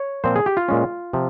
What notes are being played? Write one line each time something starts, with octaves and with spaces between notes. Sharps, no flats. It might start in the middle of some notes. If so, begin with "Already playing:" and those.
Already playing: C#5
A#2 F3 C4 C5
G#4
G4
F4
A#2 G#3 C#4
C3 F3